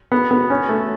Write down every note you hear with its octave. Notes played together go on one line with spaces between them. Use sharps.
B3
B3
C#4
A3